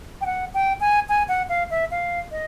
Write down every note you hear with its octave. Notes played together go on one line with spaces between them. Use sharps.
G5
F#5
G5
G#5
G#5
F#5
F5
E5
F5
D#5